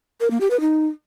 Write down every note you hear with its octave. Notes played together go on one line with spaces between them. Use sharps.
A#4
A#3
G4
B4
D#4